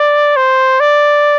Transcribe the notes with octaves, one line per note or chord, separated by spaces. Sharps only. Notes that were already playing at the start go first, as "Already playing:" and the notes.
Already playing: D5
C5
D5